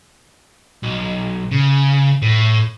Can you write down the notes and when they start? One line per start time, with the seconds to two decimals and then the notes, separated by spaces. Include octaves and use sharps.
0.83 B1
1.52 C#3
2.22 A2